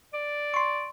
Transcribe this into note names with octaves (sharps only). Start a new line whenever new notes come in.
D5
C6 C#6